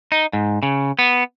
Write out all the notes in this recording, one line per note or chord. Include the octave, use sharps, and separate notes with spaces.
D#4
G#2
C#3
B3